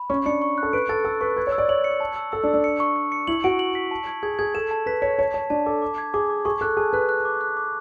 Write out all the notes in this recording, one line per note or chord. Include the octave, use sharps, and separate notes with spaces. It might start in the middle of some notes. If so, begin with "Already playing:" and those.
Already playing: B5
C#4 C#6
D4 C#7
C#6
F#6
A4
B4 D7
A4 A6
A4 E6
B4 C#6
B4 G#6
C#5
E6
D5
C#5 F#7
C#7
A5
E6
A4 E6
D4
E6
D4
C#7
C#6
C#6
C#7
E4 F#7
F#4 D7
F#7
B6
A5
G#6
G#4 G#6
G#4 G#6
A4 E7
A5
B4 B6
C#5 B6
C#5 A5
C#5 A5
D4 A5
A4 D6
D6
G#6
G#4 D6
D6
G#4 C#6
A4 F#6
G#4 A5
B4 F#6
F#6
D6
F#6
D6